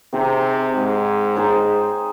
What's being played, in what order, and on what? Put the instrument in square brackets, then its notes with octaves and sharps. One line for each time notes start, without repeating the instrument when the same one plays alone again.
[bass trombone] C3 [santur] C4 D#4 G#4
[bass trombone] G#2
[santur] G#3 D#4 G#4 C5